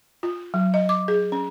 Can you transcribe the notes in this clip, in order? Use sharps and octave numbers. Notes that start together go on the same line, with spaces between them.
F4
F#3
D#5
D6
G#4
C#4